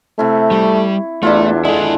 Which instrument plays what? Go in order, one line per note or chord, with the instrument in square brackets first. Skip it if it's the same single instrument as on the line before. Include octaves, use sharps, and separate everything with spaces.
[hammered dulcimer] C3 E4 [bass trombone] A3
[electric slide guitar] G3 [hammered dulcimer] C#6
[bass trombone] E2 [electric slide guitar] A3 [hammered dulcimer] D4 E4 F4
[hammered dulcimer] D3 G#3 A5 [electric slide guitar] E4 G#4